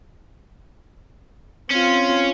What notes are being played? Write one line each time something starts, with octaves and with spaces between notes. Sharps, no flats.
C4 C#4 F4